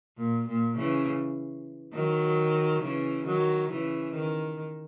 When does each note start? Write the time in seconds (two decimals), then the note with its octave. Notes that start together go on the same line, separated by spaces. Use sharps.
0.17 A#2
0.47 A#2
0.76 C#3 E3
1.94 D#3 F#3
2.82 C#3 E3
3.26 D#3 F#3
3.70 C#3 E3
4.14 D#3